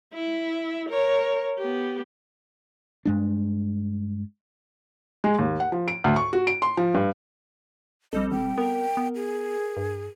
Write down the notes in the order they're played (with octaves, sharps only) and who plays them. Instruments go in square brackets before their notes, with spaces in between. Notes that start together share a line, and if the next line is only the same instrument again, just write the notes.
[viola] E4 E5
A#4 C#5
B3 G4
[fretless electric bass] G2 G#3 D4
[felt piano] G#3
D#2
F#5
F3
D7
D2
C#6
F#4
D7
C6
F3
G2
[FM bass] A#1 [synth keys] G3 C4 A4 [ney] D#5
[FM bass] E1 [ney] G5
[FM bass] B3 [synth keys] A#4
[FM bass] B3
[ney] G#4
[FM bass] G2